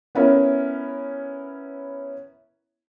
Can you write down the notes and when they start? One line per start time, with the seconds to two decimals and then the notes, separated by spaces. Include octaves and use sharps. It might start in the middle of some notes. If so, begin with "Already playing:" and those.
0.15 B3 C#4 E4 A#4